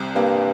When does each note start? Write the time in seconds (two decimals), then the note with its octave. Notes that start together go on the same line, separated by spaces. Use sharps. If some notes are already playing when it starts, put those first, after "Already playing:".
Already playing: C2 C3
0.15 G2 A#3